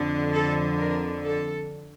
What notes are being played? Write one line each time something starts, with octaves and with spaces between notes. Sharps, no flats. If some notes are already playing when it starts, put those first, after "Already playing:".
Already playing: F2 D3
A4
A#4
A4